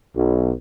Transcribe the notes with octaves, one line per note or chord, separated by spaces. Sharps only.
B1